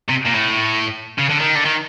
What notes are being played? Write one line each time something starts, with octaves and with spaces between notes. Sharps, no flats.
C3
A#2
A2
C#3
D3
D#3
D3
D#3